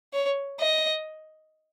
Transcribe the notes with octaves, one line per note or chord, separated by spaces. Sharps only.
C#5
D#5